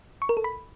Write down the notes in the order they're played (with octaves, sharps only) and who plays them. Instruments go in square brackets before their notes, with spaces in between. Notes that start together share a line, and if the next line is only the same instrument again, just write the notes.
[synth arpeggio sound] C#6
A#4
A4
B5